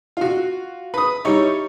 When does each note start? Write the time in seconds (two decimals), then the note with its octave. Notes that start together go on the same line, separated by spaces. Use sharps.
0.17 F4 F#4
0.94 B4 D#6
1.25 G3 D#4 E4 C#5